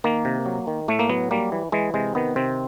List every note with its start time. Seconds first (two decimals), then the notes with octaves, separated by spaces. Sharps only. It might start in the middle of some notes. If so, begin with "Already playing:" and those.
0.04 D#3 A#3
0.25 C3
0.46 F#3
0.67 D#3
0.88 A2 A3
0.99 A#3
1.10 F#3 B3
1.31 G3 A#3
1.52 E3
1.72 E3 G#3
1.94 C3 G#3
2.15 D#3 B3
2.36 C3 C4